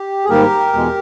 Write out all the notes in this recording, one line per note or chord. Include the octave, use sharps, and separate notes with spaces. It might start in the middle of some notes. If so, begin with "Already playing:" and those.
Already playing: G4
G#4
G#2 D#3 G3 A#3 G4 A#4
E2 B2 G#3